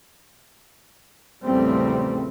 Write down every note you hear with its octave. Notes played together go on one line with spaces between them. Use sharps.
A#1 E2 C#3 G3 A3 C4